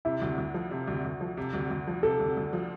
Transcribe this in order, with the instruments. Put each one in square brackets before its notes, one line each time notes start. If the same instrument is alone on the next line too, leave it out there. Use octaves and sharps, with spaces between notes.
[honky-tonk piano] C3 [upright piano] E4
[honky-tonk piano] D2
D2
F3
C3
D2
D2
F3
C3
D2
D2
F3
[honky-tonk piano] C3 [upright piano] A4
[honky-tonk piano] D2
D2
F3